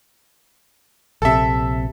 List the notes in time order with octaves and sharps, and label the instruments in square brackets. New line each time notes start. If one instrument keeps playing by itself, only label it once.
[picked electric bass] A#1 C3 [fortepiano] A4 E5